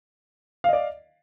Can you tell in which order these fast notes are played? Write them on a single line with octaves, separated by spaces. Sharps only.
F5 D#5 D5